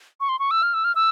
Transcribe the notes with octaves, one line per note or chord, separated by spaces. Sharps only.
C#6
C6
C#6
E6
F6
E6
F6
E6